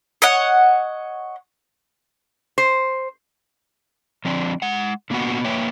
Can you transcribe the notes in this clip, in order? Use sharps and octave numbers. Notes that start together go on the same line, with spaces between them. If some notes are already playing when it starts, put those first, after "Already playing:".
C#5 D#5 F#5
C5
F3 C4 D4 D5
G#3 F#5
D3 A#3 B3 F4 F#4 F#5
A#3 B4 C#5 E5 G5